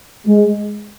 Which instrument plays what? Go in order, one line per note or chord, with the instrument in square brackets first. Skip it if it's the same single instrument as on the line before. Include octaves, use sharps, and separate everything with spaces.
[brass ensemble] G#3